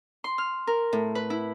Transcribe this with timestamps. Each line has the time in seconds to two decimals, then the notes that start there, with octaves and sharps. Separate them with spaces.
0.24 C6
0.38 F6
0.67 A#4
0.93 A2
1.15 B4
1.30 E4